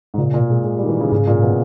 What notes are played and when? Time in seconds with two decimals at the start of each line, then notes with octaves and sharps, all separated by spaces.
0.14 G#2
0.18 A#2 C#3
0.34 A#2
0.41 B2
0.50 G#3
0.64 G#3
0.77 G3
0.83 D#3
0.89 E3
1.00 C#3
1.11 G#2 C#3
1.27 A#2
1.43 B2